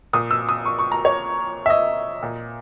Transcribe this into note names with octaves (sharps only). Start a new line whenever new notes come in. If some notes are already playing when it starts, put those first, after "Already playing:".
A#2 D#6
E6
D#6
C#6
C#6
A#5
C#5
E5
D#5
A#2